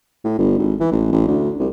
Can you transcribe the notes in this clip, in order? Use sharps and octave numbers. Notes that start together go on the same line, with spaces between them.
A2
G1
G#1
E3
A1
A1
D2
C2